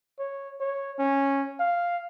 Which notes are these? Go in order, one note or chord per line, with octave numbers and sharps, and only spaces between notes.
C#5
C#5
C#4
F5